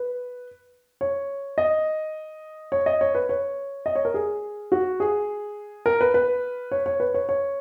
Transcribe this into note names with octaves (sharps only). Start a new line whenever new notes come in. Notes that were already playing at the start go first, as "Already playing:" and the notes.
Already playing: B4
C#5
D#5
C#5
D#5
C#5
B4
C#5
D#5
C#5
A#4
G#4
F#4
G#4
A#4
B4
B4
C#5
C#5
B4
C#5
C#5